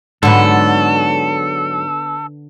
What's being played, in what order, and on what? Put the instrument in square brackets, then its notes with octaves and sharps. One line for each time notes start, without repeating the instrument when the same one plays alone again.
[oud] G#2 F#3 [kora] D3 B3 [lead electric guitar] A4